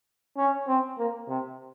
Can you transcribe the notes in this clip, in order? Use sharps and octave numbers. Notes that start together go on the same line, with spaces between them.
C#4
C4
A#3
C3